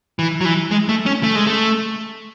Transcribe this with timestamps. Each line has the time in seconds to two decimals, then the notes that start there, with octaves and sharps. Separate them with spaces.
0.19 E3
0.41 F#3
0.45 E3
0.71 G#3
0.89 A3
1.06 C#4
1.23 A3
1.35 G#3
1.47 A3